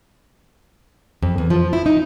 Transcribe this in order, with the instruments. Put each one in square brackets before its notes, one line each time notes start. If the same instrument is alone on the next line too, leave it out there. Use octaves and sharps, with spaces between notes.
[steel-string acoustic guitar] F2
E2
F3
E4
D#4